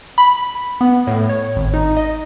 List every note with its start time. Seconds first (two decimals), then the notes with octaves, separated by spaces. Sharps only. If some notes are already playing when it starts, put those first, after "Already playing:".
0.18 B5
0.81 B3
1.07 A2
1.29 C#5
1.56 G#1
1.74 D#4
1.97 D#5